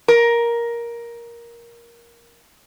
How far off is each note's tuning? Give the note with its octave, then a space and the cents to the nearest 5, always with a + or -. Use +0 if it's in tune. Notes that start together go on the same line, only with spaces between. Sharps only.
A#4 +10